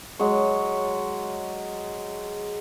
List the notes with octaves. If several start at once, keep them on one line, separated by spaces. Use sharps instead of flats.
F#3 G#3 C#5